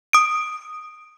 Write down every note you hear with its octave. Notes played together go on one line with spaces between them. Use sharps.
D#6 D7